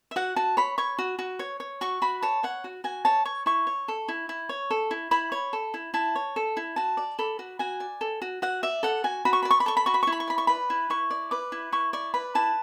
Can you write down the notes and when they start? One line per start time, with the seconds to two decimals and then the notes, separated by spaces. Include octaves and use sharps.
0.11 E5
0.16 F#4 F#5
0.36 F#4 A5
0.57 C#5 B5
0.78 C#5 C#6
0.99 F#4
1.19 F#4
1.39 C#5
1.60 C#5
1.81 F#4 C#6
2.02 F#4 B5
2.22 C#5 A5
2.43 C#5 F#5
2.64 F#4
2.84 F#4 G#5
3.05 C#5 A5
3.25 C#5 C#6
3.46 E4 C#6
3.67 C#5
3.88 A4
4.08 E4
4.29 E4
4.49 C#5
4.71 A4
4.91 E4
5.11 E4 B5
5.32 C#5
5.53 A4
5.74 E4
5.94 E4 A5
6.15 C#5
6.36 A4
6.57 E4
6.76 F#4 A5
6.97 D5
7.19 A4 B5
7.39 F#4
7.59 F#4 G#5
7.80 D5
8.01 A4
8.22 F#4
8.42 F#4 F#5
8.63 D5 E5
8.83 A4 F#5
9.04 F#4 G#5
9.25 F#4 B5
9.33 C#6
9.43 B5
9.45 D5
9.51 C#6
9.60 B5
9.66 A4 C#6
9.77 B5
9.86 F#4 C#6
9.94 B5
10.03 C#6
10.07 E4
10.12 B5
10.20 C#6
10.28 D5 B5
10.38 C#6
10.47 B4 B5
10.70 E4
10.90 E4 C#6
11.11 D5
11.31 B4 D6
11.52 E4
11.72 E4 C#6
11.93 D5 C#6
12.14 B4 B5
12.35 E4 A5